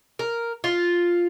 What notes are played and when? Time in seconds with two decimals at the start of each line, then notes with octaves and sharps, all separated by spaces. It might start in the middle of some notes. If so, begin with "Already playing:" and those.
0.19 A#4
0.64 F4